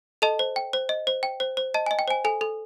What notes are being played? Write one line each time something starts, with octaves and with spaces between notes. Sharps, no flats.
A4 D#5 A5
C5
G5
C5
D#5
C5
G5
C5
C5
D#5 A5
D#5 G#5
G5
C5 G#5
A4 G#5
A4